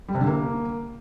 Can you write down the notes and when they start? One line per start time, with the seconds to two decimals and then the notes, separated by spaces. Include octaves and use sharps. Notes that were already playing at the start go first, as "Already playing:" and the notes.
0.08 G3
0.15 C3
0.21 D3
0.27 A#3